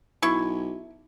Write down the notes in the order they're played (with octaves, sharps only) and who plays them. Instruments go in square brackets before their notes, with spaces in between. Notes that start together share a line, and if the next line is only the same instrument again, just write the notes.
[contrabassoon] B1 [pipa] E4 C#6